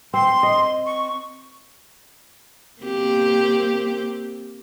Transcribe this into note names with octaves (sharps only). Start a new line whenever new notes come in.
C4 C6
D#5
C#6
A#3 C4 G4